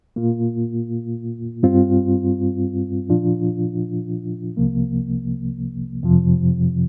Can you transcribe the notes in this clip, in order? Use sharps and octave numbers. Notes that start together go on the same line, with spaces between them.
A#2 A#3 F4
G2 G3 C4 F4
A#2 F3 D4 F4
C2 C3 F3 A#3
F2 C3 F3